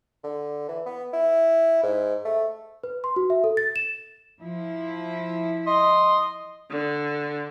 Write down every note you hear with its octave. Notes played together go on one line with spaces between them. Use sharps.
D3
E3
B3
E4
G#2
A3
B4
C6
F#4
E5
A4
A6
E7
F3 E4
D#5 C6 D#6
D3